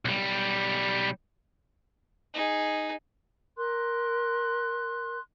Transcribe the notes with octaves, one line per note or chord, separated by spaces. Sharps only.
B1 G3
D#4 G#4
A#4 C6 F#6